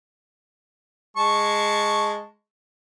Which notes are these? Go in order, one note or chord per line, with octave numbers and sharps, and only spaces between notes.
G#3 A5 C#6